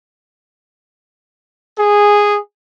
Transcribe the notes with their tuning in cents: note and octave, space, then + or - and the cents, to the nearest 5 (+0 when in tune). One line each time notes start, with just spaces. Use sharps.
G#4 -10